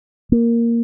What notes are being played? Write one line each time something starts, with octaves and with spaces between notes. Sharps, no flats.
A#3